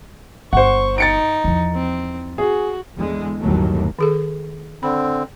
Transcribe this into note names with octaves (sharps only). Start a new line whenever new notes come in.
G1 C5 F#5 C#6
D#4 A6 C#7 D7
E2 F3
C4
F#4 G#4
E2 D3 G#3
G1 D#2 A2 F#3 A3
D#3 G#4 A4
D3 C4 B5